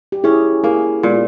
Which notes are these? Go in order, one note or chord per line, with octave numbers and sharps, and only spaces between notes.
G4
C#4 E4 G#4
A#3 E4 G#4
A#2 G#3 B3